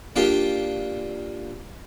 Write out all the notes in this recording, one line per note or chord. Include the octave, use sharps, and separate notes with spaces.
A#3 D4 F4 G4